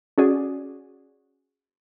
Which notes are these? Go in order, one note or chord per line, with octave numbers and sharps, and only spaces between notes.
C#4 F#4 G#4 D5